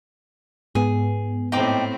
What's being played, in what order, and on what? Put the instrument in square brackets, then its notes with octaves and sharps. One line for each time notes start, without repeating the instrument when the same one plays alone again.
[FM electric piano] G#2 B3 [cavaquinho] G#4
[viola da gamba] A2 C4 [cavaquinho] D#4 G5 D6